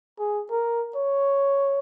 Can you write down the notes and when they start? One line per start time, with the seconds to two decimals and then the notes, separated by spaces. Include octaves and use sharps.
0.19 G#4
0.51 A#4
0.96 C#5